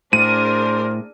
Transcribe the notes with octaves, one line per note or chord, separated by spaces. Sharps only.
A2 D4 G#4 A#4 C5 D#7